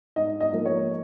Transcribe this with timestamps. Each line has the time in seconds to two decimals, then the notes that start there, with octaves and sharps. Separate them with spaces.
0.16 G#2 D#5
0.40 D#5
0.53 F3 A#3
0.65 C#5